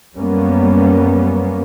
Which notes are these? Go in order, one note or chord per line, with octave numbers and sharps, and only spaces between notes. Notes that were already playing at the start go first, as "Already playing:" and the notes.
F#2 G3 A#3 B3 C#4